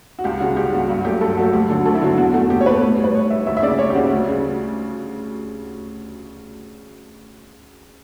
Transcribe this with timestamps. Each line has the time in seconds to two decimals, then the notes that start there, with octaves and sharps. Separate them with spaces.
0.19 F#4
0.24 C#2 G4
0.40 C#3 G3 F#4
0.56 C#2 G4
0.73 C#3 G3 F#4
0.88 G2 F#4
1.05 F#3 A3 G4
1.21 G2 A4
1.37 F#3 A3 F#4
1.53 D2 G4
1.69 D3 F#3 A4
1.85 D2 A4
1.95 E4
2.02 D3 F#3 F#4
2.18 E2 F#4
2.34 B2 A3 F#4
2.50 E2 G4
2.61 C#5
2.66 B2 A3 B4
2.82 A2
2.98 G3
3.04 B4
3.14 A2 C#5
3.30 G3 E5
3.46 D2 E5
3.57 E5
3.63 C#3 D5
3.66 G3
3.79 D2 C#5
3.90 G4
3.95 C#3 G3 F#4
4.11 D2
4.27 C#3 G3